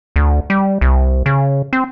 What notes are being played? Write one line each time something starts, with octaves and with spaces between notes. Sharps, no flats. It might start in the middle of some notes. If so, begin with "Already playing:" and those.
D2
G3
C2
C#3
C4